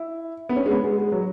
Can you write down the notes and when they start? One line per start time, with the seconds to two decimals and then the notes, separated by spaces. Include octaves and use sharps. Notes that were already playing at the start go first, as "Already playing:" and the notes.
Already playing: E4
0.49 B3
0.56 C#4
0.66 G#3
0.71 B3
0.84 G#3
0.98 G#3
1.12 F#3